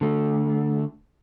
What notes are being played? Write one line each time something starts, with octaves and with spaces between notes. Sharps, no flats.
D3 A3